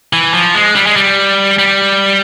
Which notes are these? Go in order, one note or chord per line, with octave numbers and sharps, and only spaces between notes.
E3
F3
G#3
G3
G#3
G3
G3